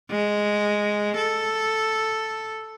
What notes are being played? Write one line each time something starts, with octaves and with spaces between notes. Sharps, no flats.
G#3
A4